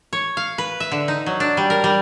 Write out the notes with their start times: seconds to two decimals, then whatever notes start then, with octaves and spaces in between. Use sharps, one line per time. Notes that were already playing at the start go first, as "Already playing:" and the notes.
0.13 C#5
0.37 F5
0.58 B4
0.80 E5
0.92 D3
1.08 D#4
1.26 F#3
1.40 D4
1.57 G3
1.70 A#4
1.84 G3